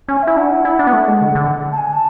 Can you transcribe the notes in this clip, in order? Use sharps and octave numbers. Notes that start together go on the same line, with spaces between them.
C#4 G#5
E5
E4
D4 F#5
E4
E4
D4
B3
A3
G#3
D3
D3
A5
G#5
A5